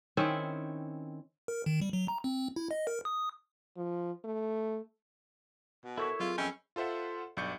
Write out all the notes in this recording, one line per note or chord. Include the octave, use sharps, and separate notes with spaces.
D#3 C4 C#4 E4
A#4
D#3
G3
F#3
A#5
C4
E4
D#5
A#4
D#6
F3
A3
B2
E4 A4 A#4 C#5 E5
F#3 F4 G#4 F5
F2 C#4 D#5 E5 G5 B5 E6
F4 A4 C5 E5 F#5
B1 G2 D5 C#6 G6 C#7